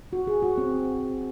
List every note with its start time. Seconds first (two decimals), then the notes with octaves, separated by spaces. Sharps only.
0.13 F#4
0.27 G#4
0.42 F#4
0.58 C4